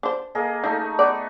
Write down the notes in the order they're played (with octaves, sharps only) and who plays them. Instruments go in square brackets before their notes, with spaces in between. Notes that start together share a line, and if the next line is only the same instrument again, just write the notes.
[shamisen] D4 C5
[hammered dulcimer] A#3 G#4 D#5
[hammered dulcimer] A3 D#4 [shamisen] D4
[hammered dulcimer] B3 C#6 [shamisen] D5